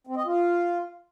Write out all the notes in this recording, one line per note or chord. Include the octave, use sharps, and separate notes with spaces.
C4
D#5
F4